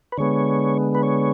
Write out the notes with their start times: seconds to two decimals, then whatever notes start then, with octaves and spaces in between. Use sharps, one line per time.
0.12 B4
0.17 D3 G#3 B3 C#5
0.95 B4
1.03 C#5